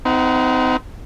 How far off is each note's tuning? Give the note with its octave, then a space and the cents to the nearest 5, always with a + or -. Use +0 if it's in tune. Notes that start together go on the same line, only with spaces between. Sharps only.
C4 -30 D#4 +25 F#5 +0